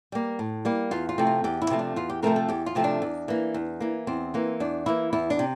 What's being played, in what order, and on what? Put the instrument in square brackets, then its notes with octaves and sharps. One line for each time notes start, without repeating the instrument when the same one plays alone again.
[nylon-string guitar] G3 A#3
A2
G3 A#3
E2 F4
F4
C3 F3 A3 C4
F4
E2 G4
E4
C3 F3 A3 C4
D4
E2 F4
G4
C3 F3 A3 C4 A#4
A4
E2 G4
F4
C3 F3 A3 C4
D4
E2
E3 A#3
E2
E3 A#3
E2 C4
E3 A#3
E2 D4
E3 A#3 E4
E2 E4
D4
C3